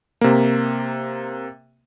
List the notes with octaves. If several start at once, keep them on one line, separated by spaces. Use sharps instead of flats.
C3 A#3